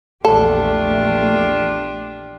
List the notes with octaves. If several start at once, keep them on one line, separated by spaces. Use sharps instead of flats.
A#1 E2 A3 D4 F4 G4 A4